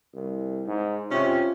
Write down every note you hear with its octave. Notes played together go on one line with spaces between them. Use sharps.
C2
G#2
C3 C#4 F4